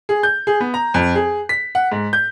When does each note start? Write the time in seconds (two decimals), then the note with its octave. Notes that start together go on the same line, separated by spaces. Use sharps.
0.09 G#4
0.23 G6
0.47 G#4
0.60 B3
0.74 A#5
0.94 F2
1.15 G#4
1.49 B6
1.75 F#5
1.92 G#2
2.13 G6